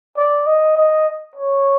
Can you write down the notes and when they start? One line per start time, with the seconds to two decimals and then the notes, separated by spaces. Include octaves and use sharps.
0.17 D5
0.47 D#5
0.77 D#5
1.35 C#5